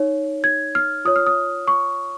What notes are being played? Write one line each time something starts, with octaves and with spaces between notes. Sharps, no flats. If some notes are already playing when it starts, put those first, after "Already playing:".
Already playing: D#4 C#5
G#6
F6
F4 C#5 D#6
F6
D#6
C#6